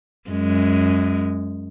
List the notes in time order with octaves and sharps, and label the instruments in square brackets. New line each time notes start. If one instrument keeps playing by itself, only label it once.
[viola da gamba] F#2 G#3